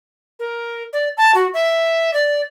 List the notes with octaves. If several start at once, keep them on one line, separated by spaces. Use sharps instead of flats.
A#4
D5
A5
F#4
E5
D5